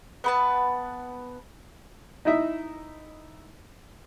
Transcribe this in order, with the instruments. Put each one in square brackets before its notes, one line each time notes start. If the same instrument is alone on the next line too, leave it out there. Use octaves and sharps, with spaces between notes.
[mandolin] B3 B4 A5
[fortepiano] D#4 E4 D#5 E5